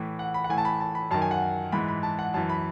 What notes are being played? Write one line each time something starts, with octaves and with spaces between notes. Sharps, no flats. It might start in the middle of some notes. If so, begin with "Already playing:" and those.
Already playing: A2 E3
F#5
B5
F#5
A2 E3 G#5
A5
B5
A5
B5
F#2 D#3 A5
G#5
F#5
G#2 E3 B5
B5
A5
F#5
F#2 E3 A5
B5